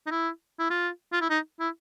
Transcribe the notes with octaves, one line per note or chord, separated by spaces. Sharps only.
D#4
E4
E4
F4
F4
E4
D#4
E4